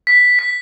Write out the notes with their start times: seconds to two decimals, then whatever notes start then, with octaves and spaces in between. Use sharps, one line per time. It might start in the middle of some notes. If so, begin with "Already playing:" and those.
0.07 B6
0.39 B6